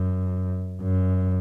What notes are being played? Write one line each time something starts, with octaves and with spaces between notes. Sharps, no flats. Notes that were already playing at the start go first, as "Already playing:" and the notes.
Already playing: F#2
F#2